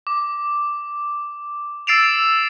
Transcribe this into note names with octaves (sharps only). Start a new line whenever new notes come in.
D6
E6 A6 C7 D7 E7 F7